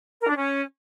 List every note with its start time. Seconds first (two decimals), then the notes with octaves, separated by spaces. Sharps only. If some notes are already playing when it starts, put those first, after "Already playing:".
0.21 A#4
0.29 D4
0.36 C#4